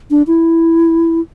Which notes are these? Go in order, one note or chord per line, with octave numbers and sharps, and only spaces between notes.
D4
E4